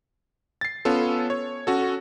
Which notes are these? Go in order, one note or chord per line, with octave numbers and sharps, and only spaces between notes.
A6 C7
B3 C#4 F4 A4
C#5
C#4 F#4 A4